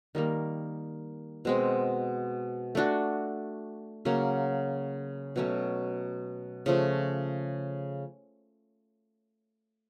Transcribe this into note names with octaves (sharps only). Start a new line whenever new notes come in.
D#3 G3 A#3
B2 G#3 C4
A3 D4 F#4
C#3 F#3 A#3 C#4
B2 F#3 A3 C#4
C#3 F3 A3